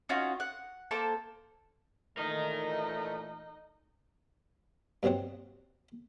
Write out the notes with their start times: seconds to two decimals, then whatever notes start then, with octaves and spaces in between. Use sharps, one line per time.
0.09 C#4 D#4 F4 F#4
0.40 F#5
0.91 A#3 A4 C5 A5
2.17 A#2 E3 A3 D#4 A#4 D#5
5.03 G2 B2 F#3 C4 F#5